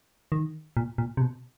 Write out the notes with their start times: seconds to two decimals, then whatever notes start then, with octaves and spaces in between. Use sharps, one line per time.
0.32 D#3
0.77 A#2
0.98 A#2
1.17 C3
1.22 B2